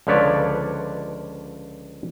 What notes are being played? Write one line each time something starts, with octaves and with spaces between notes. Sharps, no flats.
C#2 D3 F3 B4 C#5 D5